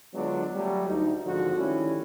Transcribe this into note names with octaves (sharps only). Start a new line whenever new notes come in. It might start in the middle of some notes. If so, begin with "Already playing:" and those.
D3 F#3 G#3 B3 D4 F4
F#3 G3 A3
D2 D#4
G#1 D3 F3 G#3 F#4
D#3 G3 A3 C#4 E4